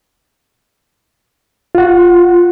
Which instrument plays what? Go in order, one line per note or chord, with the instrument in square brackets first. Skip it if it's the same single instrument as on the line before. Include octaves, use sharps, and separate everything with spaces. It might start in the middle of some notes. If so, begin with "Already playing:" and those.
[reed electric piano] F4 F#5